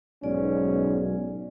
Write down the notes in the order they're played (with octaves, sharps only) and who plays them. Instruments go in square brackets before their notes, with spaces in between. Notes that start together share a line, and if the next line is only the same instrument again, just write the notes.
[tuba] B1 [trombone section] G#2 B2 C#4 [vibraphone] D5